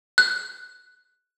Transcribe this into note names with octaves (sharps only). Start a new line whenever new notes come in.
F#6